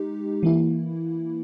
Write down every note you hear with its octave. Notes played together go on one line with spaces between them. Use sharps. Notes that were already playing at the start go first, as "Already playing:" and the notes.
Already playing: G#3 D#4 G4
E3 A#3 E4